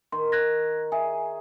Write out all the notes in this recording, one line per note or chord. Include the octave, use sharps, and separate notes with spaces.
D#3 C6
F#6 G#6 A#6
G#4 E5 G#5